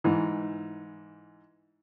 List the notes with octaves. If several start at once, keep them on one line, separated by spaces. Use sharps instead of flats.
G#2 E3